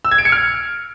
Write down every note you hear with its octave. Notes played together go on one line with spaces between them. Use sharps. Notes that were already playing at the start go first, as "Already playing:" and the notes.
E6
G#6
D7
C#7
F6